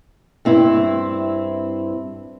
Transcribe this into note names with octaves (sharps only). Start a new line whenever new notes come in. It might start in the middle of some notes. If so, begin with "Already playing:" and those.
G2 C4 E4